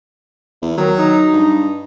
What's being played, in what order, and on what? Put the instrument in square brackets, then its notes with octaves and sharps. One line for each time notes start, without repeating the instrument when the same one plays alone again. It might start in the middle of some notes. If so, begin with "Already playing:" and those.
[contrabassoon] E2
[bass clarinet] D#3 [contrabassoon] F#3
[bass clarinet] D#4
[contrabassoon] G2